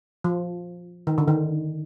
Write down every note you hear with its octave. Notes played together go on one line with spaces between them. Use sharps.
F3
D#3
D3
D#3